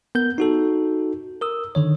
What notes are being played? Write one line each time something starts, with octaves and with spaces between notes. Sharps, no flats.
B3 A#4 G6
D#4 F#4 A4
A#4 D#6 E6
D3 D#3 C#5